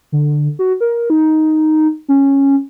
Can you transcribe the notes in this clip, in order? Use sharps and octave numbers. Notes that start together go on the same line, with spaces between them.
D3
F#4
A#4
D#4
C#4